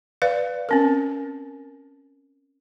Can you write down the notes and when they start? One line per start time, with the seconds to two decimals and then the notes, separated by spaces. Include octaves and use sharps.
0.22 B4 D5 F5
0.69 C4 C#4 A#4